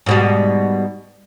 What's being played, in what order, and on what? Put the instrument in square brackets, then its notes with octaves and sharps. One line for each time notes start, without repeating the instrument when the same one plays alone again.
[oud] G#2 B2 G3